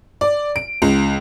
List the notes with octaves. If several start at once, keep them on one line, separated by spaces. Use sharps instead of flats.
D5
D7
C#2